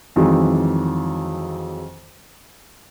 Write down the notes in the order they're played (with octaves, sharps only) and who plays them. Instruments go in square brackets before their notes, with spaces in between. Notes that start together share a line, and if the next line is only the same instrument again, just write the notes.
[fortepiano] F2 D#3 E3 F#3 G#3